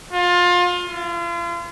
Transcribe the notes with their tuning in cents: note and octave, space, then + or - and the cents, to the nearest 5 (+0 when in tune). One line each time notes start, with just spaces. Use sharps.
F4 +25
F4 -35